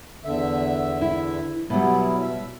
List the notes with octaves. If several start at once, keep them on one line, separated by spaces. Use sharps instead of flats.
E2 D3 E5
E4
B2 F#3 G3 B3 E4
E5